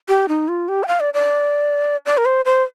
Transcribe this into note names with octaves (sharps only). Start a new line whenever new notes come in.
G4
D#4
F4
G4
G5
F5
D5
D5
D5
A#4
C5
C5